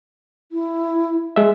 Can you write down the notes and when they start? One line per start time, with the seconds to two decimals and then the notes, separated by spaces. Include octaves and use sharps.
0.52 E4
1.36 G#3 E5